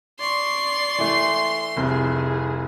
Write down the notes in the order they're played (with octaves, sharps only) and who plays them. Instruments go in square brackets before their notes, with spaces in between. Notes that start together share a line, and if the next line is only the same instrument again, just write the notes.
[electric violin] D5 C#6 [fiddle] C6
[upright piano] E3 A3
[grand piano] F1 C2 [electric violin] E4 G#4